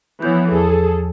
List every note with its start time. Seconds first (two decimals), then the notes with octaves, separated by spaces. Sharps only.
0.22 E3 F3 B3 E4 C#5 G6
0.51 E2 G#4 A4